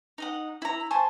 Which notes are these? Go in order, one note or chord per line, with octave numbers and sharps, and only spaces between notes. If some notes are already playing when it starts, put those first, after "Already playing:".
D#4 D#5 F#5
E4 A#5
C5 G#5 A5 C#6